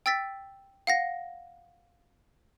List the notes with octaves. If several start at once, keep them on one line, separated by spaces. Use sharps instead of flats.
G5 E6 A6 B6
F5 F#5 A#6